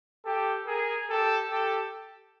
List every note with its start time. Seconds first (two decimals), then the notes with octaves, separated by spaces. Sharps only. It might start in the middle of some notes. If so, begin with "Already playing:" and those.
0.24 G4 A4
0.66 G#4 A#4
1.08 G4 A4
1.49 G4 A4